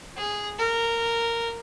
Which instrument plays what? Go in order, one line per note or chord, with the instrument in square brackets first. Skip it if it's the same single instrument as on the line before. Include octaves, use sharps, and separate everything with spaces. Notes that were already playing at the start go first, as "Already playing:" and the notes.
[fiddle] G#4
A#4